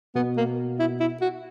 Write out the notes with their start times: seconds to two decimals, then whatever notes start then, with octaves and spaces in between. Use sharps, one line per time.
0.15 B2 B3
0.37 A#3
0.79 E4
1.00 E4
1.21 F#4